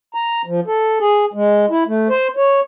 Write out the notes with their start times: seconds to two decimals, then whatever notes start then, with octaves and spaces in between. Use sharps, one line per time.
0.14 A#5
0.46 F3
0.67 A4
1.00 G#4
1.33 G#3
1.70 E4
1.87 A3
2.09 C5
2.37 C#5